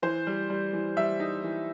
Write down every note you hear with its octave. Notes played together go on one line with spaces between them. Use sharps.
E3 C5
G3
G3
E3
G3 E5
D#4
E3